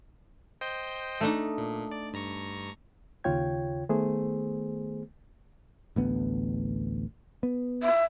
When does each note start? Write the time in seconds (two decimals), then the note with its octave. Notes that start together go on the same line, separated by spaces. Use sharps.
0.61 C5 D#5 G5
1.21 A3 D4 D#4
1.58 A#2
1.91 D5
2.13 G2 A#5 C#6
3.24 D#2 C#3 F4 C#5 G5 G#6
3.89 D#3 A3 B3 G#4 C5
5.96 A1 D2 B3
7.43 B3
7.83 E5